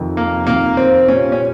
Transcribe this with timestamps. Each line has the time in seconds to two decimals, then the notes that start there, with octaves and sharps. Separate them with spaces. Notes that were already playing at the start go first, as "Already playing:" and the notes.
Already playing: F2 C3 D#3
0.17 A#3
0.47 F2 C3 D#3 A#3
0.77 C4
1.08 A#2 G3 A#3 C#4 F4
1.32 C#4